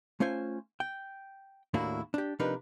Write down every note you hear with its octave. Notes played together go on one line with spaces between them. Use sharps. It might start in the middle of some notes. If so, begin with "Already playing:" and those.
A3 C#4 F4 C5 G#5
G5
D#2 A2 A#3 D4 E4 F#4
D4 G4
C3 F3 D4 D#4 A#4 B4